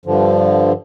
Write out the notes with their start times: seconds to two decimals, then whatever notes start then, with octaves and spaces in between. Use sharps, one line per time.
0.05 G2 D3 F3